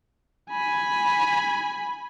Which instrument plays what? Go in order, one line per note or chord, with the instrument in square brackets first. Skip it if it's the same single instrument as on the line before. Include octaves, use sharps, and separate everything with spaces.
[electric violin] G#5 B5